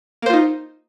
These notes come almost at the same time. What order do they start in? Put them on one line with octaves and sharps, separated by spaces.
A#3 C5 F4 D#4